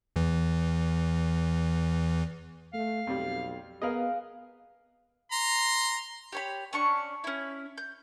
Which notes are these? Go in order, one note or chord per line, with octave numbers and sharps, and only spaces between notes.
E2 E3
A3 F5
B1 F2 G3
B3 G#4 A#4 B4 D#5 F5
A#5 C6
G4 C#5 B5
C#4 D4 C#6
C#4 E4
G6